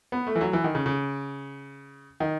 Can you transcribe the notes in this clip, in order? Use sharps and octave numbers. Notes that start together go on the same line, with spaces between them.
B3
A3
E3
F#3
E3
D#3
C#3
C#3
D#3